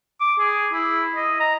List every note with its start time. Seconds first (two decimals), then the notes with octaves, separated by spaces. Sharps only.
0.21 D6
0.39 G#4
0.73 E4
1.16 D#5
1.40 A#5